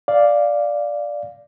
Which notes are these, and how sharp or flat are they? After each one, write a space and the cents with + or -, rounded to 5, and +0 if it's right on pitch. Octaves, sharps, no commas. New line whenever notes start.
D5 +0 F5 +0